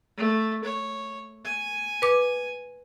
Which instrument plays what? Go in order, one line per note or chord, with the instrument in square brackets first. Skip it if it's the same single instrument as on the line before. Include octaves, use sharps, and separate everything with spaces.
[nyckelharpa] A3
C#5
G#5
[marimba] B4 D6